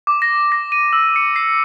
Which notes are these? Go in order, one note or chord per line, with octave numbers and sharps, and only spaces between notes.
D6
A#6
A#6
D#7
E6
C#7
C7